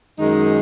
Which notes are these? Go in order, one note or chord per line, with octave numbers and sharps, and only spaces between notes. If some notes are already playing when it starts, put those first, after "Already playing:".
F#2 D#3 G#3 D#4